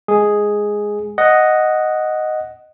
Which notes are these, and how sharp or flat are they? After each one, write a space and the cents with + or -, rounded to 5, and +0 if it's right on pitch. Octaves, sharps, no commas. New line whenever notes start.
G#3 +0 G#4 +0
D#5 +0 F#5 +0